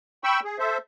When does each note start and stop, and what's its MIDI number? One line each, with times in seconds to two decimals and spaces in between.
0.24 0.40 79
0.24 0.40 83
0.24 0.40 85
0.24 0.40 88
0.44 0.58 68
0.59 0.78 69
0.59 0.78 72
0.59 0.78 76